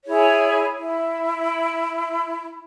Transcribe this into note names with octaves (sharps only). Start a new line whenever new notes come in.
E4 G#4 C#5
E4